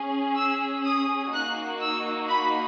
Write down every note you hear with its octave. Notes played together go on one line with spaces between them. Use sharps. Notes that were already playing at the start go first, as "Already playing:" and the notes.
Already playing: C#4 G#4
E6
D#6
A#3 D#4 F#4 F#6
E6
B5